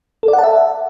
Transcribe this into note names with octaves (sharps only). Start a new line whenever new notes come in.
A4
D5
F#5
A5
E5